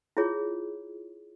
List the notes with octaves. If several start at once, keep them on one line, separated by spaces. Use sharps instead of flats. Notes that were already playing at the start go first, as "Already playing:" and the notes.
E4 F4 G#4 C#5